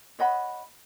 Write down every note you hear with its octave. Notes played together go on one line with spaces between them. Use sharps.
C#5 D#5 F#5 B5